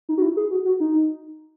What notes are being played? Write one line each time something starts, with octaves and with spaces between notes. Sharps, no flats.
D#4
F#4
E4
G#4
F#4
F#4
D#4